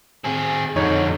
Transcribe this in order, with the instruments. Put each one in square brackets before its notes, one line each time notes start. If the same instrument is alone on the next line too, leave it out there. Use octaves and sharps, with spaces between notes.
[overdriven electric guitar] C4 G#4
[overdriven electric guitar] F2 D3 [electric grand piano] D#4 C#5